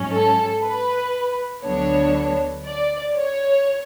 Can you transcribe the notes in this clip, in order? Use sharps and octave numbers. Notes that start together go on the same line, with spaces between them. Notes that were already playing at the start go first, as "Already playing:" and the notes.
Already playing: G#2 F#3 C#4
A4
B4
D2 D3 F#3 B3 D4 C#5
D5
C#5